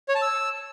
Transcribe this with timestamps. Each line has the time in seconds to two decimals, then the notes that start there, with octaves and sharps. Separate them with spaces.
0.09 C#5
0.15 A5
0.22 E6